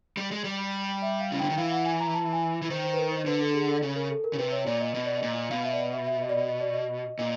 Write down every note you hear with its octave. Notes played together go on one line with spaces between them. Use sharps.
G3
G#3
G3
E5
F5
C#3
D3 G5
D#3
E3 F5
F#5
G#5
A#5
A5
G#5
E3
D#3 C5
C5
B4
A#4
C5
D3 B4
A4
G#4
A4
C#3
A#4
A4
A#4
C#3
C3 B4
C#5
A#2 D5
D#5
B2 D#5
D5
D#5
A#2
B2 F5
E5
D5
D#5
E5
E5
D#5
D5
D#5
D#5
D5
D#5
A#2 D#5